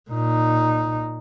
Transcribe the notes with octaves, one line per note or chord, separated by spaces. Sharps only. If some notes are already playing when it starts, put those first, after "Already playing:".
A#2 D#4